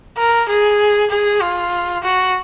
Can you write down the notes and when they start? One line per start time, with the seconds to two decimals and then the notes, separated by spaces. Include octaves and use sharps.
0.18 A#4
0.49 G#4
1.11 G#4
1.42 F4
2.04 F#4